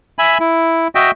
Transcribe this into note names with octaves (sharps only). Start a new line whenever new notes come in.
E5 G#5 B5
E4
F#4 D#5 E5 G5